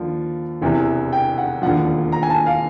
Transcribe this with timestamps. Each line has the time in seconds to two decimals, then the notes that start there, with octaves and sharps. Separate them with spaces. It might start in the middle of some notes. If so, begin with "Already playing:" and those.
Already playing: D#2 D3 F3
0.62 E1 E2 C3 E3
1.13 G5
1.38 F#5
1.62 E1 D#2 D3 F3 F#5
2.12 A#5
2.23 G#5
2.30 A5
2.46 F5